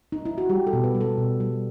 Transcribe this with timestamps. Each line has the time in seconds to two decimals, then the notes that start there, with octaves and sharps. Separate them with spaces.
0.12 D#4
0.25 E4
0.38 F#4
0.49 G3 G4
0.67 A4
0.73 B2
0.84 B4
0.95 G3
1.01 A4
1.18 B2
1.40 G3